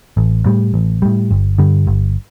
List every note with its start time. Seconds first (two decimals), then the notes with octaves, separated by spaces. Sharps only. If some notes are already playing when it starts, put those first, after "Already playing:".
0.17 A1
0.46 A2 G3
0.74 A1
1.02 A2 G3
1.31 G1
1.58 G2 D3 G3
1.87 G1